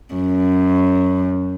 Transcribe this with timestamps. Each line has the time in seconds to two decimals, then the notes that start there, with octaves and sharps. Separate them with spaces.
0.14 F#2